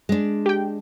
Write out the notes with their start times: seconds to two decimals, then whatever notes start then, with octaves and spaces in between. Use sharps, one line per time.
0.09 G#3 D4
0.46 G4 G5